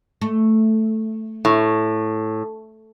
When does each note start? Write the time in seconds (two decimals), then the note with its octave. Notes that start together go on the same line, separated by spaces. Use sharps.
0.21 A3
1.45 A2